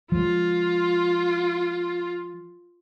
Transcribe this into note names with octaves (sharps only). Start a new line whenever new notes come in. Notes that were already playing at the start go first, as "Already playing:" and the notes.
F3 G#3 F4